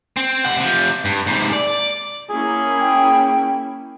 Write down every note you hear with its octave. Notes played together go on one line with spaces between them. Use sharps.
C4
C3 F#5
C3 F3
G2
G#2 C3
D5
A#3 C#4 E4 G#4
G5